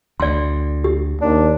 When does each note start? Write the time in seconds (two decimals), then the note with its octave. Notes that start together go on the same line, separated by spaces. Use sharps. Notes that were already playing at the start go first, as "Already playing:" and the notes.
0.20 D2 D5 C6
0.84 G4
1.21 D#2 D4